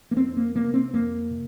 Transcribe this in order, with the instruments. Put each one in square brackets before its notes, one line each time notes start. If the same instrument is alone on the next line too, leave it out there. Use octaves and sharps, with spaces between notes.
[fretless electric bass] A#3
F2 C4
A#3
C3 A#3
C4
F2 A#3
C3